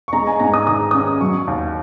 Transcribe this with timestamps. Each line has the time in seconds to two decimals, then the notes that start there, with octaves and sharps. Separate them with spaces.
0.08 C#6
0.13 G#3 A#5
0.27 G#5
0.40 G#2 A#5
0.54 D#6
0.67 D#3 D#6
0.91 C#4 D#6
1.20 F#3 C#6
1.47 D#2